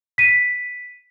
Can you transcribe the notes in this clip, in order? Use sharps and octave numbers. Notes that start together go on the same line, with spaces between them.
B6 D#7